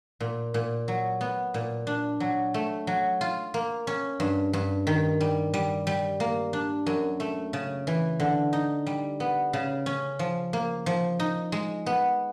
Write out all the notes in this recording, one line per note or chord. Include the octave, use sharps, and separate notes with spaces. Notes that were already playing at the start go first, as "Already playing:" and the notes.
A#2
A#2
F#3
B3
A#2
D4
F#3
A3
F#3
F4
A#3
C#4
G2
G2
D#3
G3
G3
G3
A#3
D4
F#2
A3
C#3
E3
D3
D#4
G3
B3
C#3
C#4
F3
A#3
F3
D#4
G#3
B3